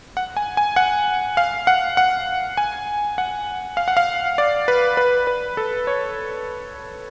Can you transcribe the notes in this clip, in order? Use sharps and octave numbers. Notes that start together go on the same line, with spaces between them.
F#5
G#5
G#5
F#5
F5
F#5
F#5
G#5
F#5
F5
F#5
F5
D5
B4
B4
B4
A4
C#5